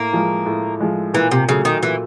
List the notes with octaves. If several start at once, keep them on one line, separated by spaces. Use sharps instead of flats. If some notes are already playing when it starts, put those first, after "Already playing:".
Already playing: A2 A#3
F3 G#3
A2
F3 G#3
A#2 E3
C3
C#3 F#3 A3
D#3
A#2 E3